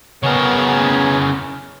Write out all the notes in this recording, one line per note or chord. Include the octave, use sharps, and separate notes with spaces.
C#3 B3 G#4 A#4 C#5